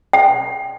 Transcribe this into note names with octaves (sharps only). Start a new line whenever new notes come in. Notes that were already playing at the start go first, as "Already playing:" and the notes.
G5